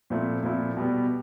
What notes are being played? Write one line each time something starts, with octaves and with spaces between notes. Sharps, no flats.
A#2 F3 A3 C4 E4
A#2 F3 A3 C4 E4
B2 G3 B3